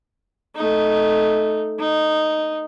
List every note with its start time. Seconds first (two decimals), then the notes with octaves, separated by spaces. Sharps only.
0.56 A3 D#4
1.79 D#4